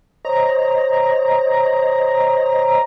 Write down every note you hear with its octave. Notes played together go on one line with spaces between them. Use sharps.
C5 C#5 D#5 A#5